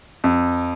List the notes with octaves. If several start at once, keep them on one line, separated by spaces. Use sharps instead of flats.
F2